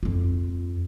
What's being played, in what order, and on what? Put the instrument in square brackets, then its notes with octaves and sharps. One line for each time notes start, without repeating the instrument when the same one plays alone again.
[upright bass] F2 F4